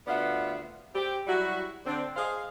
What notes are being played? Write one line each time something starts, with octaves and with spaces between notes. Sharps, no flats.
D2 B3 F4 D5 E5 F#5
C4 G4
F#3 G3 E4 F#4
D3 C4 D4
G#4 C5 D#5 F5